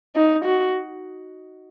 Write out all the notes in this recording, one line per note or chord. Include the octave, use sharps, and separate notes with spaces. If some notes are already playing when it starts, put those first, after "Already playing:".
D#4
F#4